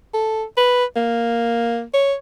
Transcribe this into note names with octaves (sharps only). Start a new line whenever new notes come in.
A4
B4
A#3
C#5